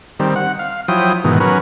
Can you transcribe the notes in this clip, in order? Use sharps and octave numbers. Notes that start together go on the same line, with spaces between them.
D#3 G3 C4
F#5
F5
F3 F#3 E4 G5 D#6
G#2 B2 D#3 E3
F#3 C#4 A#4 B4